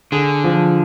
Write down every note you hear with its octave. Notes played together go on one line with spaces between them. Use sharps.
D3 G#4
F3